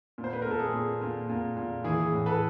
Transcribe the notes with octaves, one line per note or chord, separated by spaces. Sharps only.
A#2
C5
B4
A#4
A#2 A4
G#4
A#2
A#2
A#2
A#2
E3 G#4
A2
A4 B4